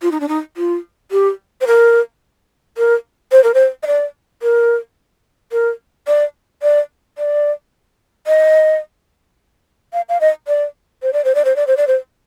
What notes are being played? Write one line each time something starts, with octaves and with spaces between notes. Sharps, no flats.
F4
D#4
D4
D#4
F4
G4
C5
A#4
A#4
C5
A#4
C5
D#5
D5
A#4
A#4
D5
D5
D5
D#5
F5
F5
D#5
D5
C5
D5
C5
D5
C5
D5
C5
D5
C5